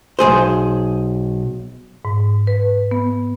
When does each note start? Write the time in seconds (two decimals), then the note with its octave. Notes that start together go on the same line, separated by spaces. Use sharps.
0.19 B1 E2 G#4 C5
2.05 G#2
2.47 B4
2.91 B3